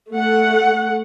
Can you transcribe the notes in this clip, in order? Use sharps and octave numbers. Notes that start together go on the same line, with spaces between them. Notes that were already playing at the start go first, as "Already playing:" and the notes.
A3 F#5